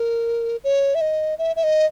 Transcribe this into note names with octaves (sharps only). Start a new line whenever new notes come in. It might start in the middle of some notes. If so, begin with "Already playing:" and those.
Already playing: A#4
C#5
E5
D#5
E5
E5
D#5